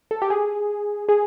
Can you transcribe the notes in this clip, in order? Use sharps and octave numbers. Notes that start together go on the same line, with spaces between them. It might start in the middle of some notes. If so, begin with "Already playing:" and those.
A4
G4
G#4
G#4